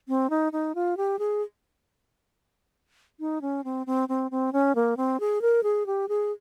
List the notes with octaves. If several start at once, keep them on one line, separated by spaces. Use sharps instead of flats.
C4
D#4
D#4
F4
G4
G#4
D#4
C#4
C4
C4
C4
C4
C#4
A#3
C4
G#4
A#4
G#4
G4
G#4